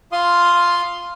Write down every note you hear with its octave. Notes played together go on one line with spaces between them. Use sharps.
F4 F5 C6 D#6